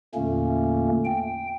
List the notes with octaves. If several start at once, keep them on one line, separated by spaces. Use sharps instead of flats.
E2 A#2 D3 A3 A#3 C#4
G5